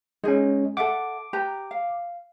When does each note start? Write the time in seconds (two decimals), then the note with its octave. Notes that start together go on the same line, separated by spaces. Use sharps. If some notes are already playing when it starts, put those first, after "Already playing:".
0.24 G#3 C#4 D#4 G#4
0.77 A4 E5 F#5 D6
1.33 G4 B4 A#5
1.71 F5